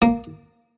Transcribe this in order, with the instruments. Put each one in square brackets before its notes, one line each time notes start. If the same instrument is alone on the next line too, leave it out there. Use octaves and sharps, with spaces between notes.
[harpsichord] A#3